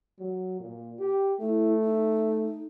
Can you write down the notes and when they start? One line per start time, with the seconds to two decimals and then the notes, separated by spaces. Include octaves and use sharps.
0.19 F#3
0.60 A#2
0.99 G4
1.41 A3 E4
1.83 D#4